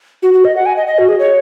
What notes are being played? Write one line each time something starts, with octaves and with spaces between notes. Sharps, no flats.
F#4
F#4
D#5
F#5
G#5
D#5
D#5
F#4
G#4
C#5